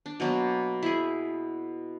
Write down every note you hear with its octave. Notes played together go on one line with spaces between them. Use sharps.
D4
B2 F#3 A#3
E4 G#4